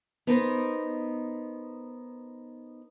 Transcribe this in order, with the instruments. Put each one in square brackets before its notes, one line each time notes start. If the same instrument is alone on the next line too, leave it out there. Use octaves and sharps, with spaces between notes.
[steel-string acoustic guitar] B3 D#4 A#4 C5